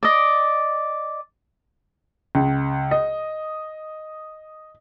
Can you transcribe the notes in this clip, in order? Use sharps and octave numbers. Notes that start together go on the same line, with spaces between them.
D5 D#5
C#2
D#5